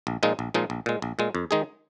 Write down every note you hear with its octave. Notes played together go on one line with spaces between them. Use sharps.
A#1
A#2 F3 G#3 D#4
A#1
A#2 F3 G#3 D#4
A#1
A#2 G#3
A#1
A#2 G#3
F2
D#3 G#3 D#4 G#4